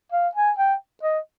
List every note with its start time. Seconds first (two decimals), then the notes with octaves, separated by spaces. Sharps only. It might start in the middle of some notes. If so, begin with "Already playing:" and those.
0.12 F5
0.35 G#5
0.58 G5
1.03 D#5